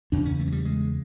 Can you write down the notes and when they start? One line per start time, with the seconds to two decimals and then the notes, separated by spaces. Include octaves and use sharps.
0.12 E2 C#3 D4
0.25 C#4
0.39 A3
0.47 F#3
0.52 G3
0.65 G#3